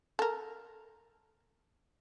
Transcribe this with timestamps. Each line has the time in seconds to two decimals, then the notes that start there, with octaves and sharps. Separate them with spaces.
0.19 A4 A#4